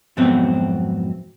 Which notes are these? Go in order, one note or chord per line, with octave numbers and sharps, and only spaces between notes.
F2 G#2 B2 F#3 C4